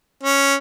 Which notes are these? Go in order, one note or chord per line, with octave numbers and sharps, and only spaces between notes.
C#4